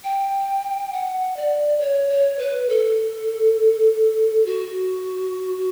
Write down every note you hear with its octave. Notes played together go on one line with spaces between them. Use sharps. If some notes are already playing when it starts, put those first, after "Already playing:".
G5
F#5
D5
C#5
C#5
B4
A4
F#4